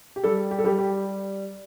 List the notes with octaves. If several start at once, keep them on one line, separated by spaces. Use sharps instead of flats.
G4
G3 A4
G4
A4
G3 G4
G4